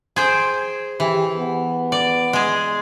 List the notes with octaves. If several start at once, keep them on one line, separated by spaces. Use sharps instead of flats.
G#4 C5 G5
E3 G4
B3
D5
G#3 G#4